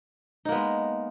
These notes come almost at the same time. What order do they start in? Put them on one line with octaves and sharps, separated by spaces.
D#4 A#3 B3 G#3